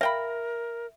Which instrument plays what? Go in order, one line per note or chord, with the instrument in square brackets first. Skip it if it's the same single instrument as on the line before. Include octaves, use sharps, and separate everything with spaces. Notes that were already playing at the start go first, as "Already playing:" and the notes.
[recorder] A#4 [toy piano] E5 [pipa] F5 G5 B5